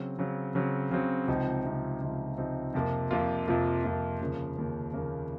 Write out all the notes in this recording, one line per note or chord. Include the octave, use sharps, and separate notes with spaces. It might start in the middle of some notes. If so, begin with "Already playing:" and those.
Already playing: C#3 F#3 C4
C#3 F#3 C4
C#3 F#3 C4
C#3 F#3 C4
C#2 C3 F3 C4 D#4
C#2 C3 F3 C4 D#4
C#2 C3 F3 C4 D#4
C#2 C3 F3 C4 D#4
F2 C3 F3 A#3 F4
F2 C3 F3 A#3 F4
F2 C3 F3 A#3 F4
F2 C3 F3 A#3 F4
D#2 C#3 F3 A#3
D#2 C#3 F3 A#3
D#2 C#3 F3 A#3